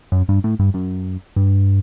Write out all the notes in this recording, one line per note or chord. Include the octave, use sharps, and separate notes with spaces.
F#2
G2
A2
G2
F#2
G2